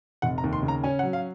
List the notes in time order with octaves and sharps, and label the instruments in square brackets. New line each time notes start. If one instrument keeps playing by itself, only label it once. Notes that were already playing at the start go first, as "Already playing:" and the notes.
[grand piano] F1 F#5
A#5
D#2
C6
C#3
A#5
C#4 G#5
F#5
F#3
F5